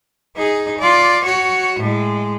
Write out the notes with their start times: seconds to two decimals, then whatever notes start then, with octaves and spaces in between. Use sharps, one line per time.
0.37 D#4 G#4
0.79 F4 D5
1.25 F#4 C#5
1.80 A2 G#3